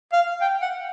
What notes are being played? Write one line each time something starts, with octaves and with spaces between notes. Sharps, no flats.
F5
G5
F#5